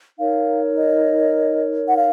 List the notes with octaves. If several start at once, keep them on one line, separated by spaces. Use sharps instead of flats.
D#4 A#4 C#5 F5
D#5
F#5
F5